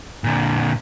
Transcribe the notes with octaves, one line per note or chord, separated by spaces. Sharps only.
A#2 D3